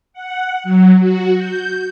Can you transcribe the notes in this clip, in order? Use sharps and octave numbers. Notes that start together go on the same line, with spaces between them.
F#5
F#3
F#4
G6